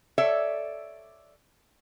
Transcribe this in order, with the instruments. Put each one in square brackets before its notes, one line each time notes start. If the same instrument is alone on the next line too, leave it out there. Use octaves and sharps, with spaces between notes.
[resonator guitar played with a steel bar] A4 C#5 D5 E5